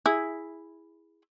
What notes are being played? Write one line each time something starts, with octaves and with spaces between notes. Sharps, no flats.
E4 G#4